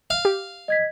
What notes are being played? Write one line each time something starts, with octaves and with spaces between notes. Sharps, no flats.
F5
G4
D#5 G#6 B6